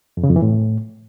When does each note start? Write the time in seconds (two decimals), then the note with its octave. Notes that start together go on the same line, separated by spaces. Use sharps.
0.17 F2
0.23 C#3
0.30 F2
0.36 E3
0.42 A2